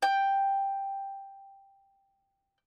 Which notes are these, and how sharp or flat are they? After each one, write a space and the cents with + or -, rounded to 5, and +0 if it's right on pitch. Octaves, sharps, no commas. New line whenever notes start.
G5 +5